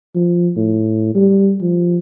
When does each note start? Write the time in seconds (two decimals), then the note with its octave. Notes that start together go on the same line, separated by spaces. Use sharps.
0.15 F3
0.56 A2
1.15 G3
1.61 F3